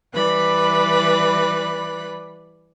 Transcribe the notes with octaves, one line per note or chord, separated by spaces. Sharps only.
E3 G3 B4 D5 B5 F#6